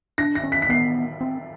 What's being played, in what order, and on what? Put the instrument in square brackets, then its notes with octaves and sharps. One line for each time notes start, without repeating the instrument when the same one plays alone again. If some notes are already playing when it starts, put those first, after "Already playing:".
[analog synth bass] D4 [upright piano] A#6
[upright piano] A#6
[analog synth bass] C#4
[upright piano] B6
B6
[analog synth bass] B3 [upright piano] C7
[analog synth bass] C4